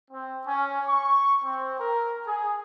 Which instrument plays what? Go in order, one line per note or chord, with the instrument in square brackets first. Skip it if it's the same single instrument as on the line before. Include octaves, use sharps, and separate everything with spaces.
[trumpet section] C4
C#4
C#6
C4
A#4
G#4